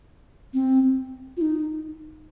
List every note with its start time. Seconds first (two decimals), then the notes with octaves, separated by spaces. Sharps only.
0.54 C4
1.37 F4
1.41 D#4